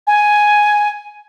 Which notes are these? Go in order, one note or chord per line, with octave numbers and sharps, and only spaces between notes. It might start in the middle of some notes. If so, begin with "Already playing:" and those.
G#5